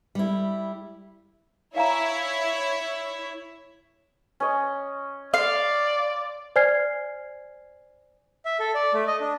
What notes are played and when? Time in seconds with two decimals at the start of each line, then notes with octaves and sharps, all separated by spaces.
0.15 G3 E4
1.76 E4 C#5 E5 F5 G#5 A#5
4.40 C#4 D#5
5.34 D5 F5 C6
6.56 C5 D5 G#5 F6 G#6 C7
8.45 E5
8.60 A4
8.75 D5
8.93 A3
9.07 D#5
9.20 D4